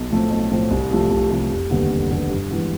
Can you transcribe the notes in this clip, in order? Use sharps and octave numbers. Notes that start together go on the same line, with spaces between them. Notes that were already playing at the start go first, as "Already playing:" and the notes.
Already playing: B1
A2 F3 A3 C4
B1
A2 F3 A3 C4
C2
C3 F3 A3
C2
C3 F3 A3
F1
D#2 D3 G3 B3
F1
D#2 D3 G3 B3
G2
E3 G#3 B3